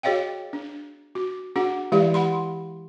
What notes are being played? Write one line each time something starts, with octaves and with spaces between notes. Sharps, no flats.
F#4 G#4 C#5 D#5 F5 G5
D4
F#4
D4 F#4 G#4 F#5
E3 G#3 E4 G4 D5 F5
F#5 B5 C6